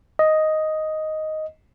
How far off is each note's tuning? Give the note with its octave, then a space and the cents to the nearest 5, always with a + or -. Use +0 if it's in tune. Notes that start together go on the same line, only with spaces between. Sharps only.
D#5 +5